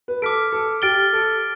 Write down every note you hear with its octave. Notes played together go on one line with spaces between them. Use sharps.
B4
A4 D6 F6 B6 D7
A4
G4 F6 A6 D7 G7
A4